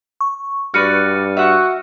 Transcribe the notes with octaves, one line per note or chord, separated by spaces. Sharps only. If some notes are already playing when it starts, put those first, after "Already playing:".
C#6
G2 F#4 B4 D5 F6 C#7 D#7
F#4 E5 F#5 C#6